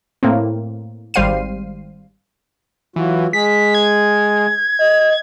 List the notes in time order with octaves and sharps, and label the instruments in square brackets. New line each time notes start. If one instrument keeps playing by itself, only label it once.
[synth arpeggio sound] A2 A#3 C4
G#1 G3 C5 F5 C7 D#7
[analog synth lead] E3 [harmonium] F#3 F4 F#4
[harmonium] G#3 G#4 [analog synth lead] B6
[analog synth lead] G#6
[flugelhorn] D#5